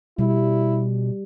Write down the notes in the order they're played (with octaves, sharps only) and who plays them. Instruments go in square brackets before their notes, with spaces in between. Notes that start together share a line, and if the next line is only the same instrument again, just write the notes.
[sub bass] B2 [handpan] G3 [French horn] E4